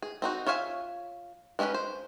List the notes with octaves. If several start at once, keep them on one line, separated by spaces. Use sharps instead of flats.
G#4
C4 D#4 F#4
F4 C#5 E5 F5 G#5
G#3 A#3 C#4 D#4 B4
C5